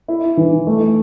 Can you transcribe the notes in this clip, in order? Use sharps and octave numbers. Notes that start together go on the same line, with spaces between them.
E4
E3
A3